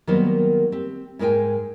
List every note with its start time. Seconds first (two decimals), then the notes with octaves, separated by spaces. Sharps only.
0.07 D#3 F#3 G3 A#3 B3 C5
0.72 C4 G4
1.19 G#2 G#3 A#4 B4 G5 G#5